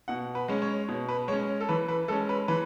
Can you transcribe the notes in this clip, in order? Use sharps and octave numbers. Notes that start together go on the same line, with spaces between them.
B2 F#5
B4
G#3 C#4
C#5
B2
B4
G#3 C#4 C#5
A4
E3 B4
B4
G#3 C#4 A4
B4
E3 B4